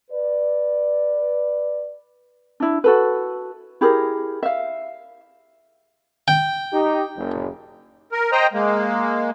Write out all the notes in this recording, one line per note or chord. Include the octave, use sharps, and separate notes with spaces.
B4 D5
D4 E4
F#4 A4 B4
E4 G4 G#4 A#4
E5 F5
G5
D#4 G4
F#1
A#4
C5 D#5 G5 A#5
G#3 A#3